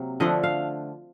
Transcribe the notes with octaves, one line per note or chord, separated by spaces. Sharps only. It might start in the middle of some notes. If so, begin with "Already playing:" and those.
Already playing: C3 F#3 A#3
D3 F3 A3 D4 D#5
F5